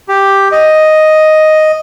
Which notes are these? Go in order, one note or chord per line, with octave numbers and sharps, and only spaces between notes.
G4
D#5